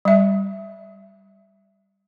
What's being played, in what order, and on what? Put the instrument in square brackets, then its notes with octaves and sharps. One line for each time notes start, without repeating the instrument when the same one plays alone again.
[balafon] G3 E5